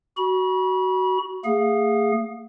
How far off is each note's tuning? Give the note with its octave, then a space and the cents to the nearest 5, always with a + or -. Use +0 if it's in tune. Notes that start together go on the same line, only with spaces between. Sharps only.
F#4 +15 B5 -35
A3 +45 G#4 -15 F5 +35